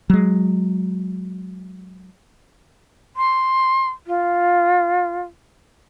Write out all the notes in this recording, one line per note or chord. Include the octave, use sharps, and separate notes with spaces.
F#3 G#3
C6
F4